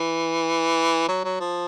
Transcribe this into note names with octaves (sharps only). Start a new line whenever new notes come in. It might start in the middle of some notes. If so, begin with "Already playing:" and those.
Already playing: E3
F#3
F#3
F3